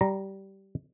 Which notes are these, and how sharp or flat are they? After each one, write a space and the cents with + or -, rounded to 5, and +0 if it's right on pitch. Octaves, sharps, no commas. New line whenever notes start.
G3 -15 A#5 +0